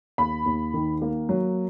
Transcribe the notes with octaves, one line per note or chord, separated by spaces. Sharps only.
D#2 B5
D#2
D#3
A#3
F#3